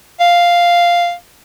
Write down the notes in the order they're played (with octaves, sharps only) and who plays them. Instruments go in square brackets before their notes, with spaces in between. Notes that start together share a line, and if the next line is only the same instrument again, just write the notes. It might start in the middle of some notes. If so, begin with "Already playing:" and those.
[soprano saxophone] F5